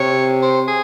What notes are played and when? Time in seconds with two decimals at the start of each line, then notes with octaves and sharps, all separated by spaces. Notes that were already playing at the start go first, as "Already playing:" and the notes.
Already playing: C3 C#5
0.42 C5
0.68 G#4